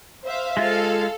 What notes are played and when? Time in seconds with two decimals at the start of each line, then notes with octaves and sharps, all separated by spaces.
0.24 C5 E5 F5
0.57 G#3 F4 A4 F5